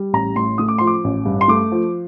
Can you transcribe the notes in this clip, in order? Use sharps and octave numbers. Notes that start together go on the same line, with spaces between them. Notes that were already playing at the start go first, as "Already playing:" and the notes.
Already playing: G3
A1 A#5
A2 C6
A3 D#6
D6
F3 C6
D6
A1
G2
C6
A3 D6
F3